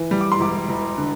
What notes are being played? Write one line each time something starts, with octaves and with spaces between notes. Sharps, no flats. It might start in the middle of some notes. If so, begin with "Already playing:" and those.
Already playing: E3
G3
D6
C6
E1 D6
E1
D3